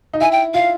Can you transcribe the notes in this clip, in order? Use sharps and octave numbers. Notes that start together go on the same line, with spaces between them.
D#4
E4 G#5
G5
F4 F5